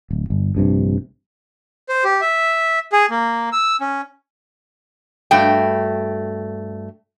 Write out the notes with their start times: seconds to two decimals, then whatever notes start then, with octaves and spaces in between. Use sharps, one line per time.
0.11 D1
0.30 G1
0.55 A#1 G2 C3
1.89 C5
2.04 G4
2.21 E5
2.92 G#4
3.10 A#3
3.52 E6
3.81 C#4
5.31 G2 A3 F#4 G5